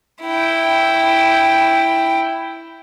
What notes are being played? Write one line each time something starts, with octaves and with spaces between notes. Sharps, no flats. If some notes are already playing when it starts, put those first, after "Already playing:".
E4 G5